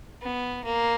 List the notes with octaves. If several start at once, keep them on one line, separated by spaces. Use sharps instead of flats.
B3
A#3